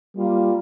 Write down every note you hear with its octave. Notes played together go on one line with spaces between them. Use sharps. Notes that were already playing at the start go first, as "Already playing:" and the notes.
G3 A#3 F4